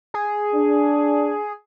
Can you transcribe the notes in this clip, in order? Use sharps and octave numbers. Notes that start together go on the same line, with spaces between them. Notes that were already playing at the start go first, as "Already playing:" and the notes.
G#4
D4